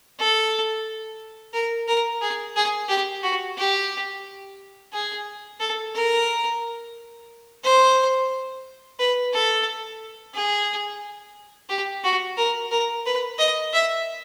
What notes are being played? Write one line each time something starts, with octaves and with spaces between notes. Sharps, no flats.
A4
A#4
A#4
G#4
G#4
G4
F#4
G4
G#4
A4
A#4
C5
B4
A4
G#4
G4
F#4
A#4
A#4
B4
D#5
E5